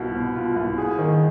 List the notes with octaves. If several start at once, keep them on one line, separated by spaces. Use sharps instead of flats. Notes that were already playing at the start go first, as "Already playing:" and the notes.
Already playing: C2 B2 F4
B3
F4
C2
G#4
D#3